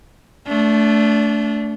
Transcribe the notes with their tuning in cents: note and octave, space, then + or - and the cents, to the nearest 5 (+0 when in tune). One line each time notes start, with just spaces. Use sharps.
A3 +0 D4 -30